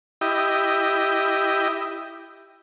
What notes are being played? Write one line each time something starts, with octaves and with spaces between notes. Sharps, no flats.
E4 G4 D#5